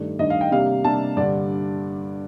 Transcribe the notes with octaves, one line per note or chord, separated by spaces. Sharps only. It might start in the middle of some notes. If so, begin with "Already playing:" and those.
Already playing: G2 D#3 A3 D4
G2 D#3 A3 D4 D#5
F5
G5
C3 G3 A#3 D4 F5
C3 G3 A#3 D4 A5
G2 D3 G3 D4 D5